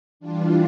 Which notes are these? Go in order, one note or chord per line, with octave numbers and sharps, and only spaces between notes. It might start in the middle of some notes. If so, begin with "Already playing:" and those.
E3 G3 D4 F4